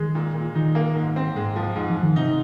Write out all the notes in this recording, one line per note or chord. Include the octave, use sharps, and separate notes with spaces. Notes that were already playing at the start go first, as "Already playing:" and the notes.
Already playing: D#3 G#3
A#2
A#2
D#3 D#4
A#3
G#2
C4
G#2 G#3
F3
F2 G#2
F3
G#2
D#3
C3 D#4